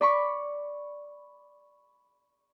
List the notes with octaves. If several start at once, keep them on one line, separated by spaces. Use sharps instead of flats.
D5 B5 C#6